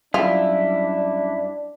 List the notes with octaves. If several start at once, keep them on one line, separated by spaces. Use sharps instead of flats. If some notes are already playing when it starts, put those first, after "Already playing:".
F#2 G3 D4 E4 F4